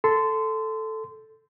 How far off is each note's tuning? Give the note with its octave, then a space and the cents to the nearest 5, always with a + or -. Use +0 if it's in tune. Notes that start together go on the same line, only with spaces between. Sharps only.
A4 +0 C6 -25